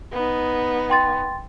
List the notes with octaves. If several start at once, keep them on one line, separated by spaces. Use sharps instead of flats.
B3 D#4
G5 C6 A6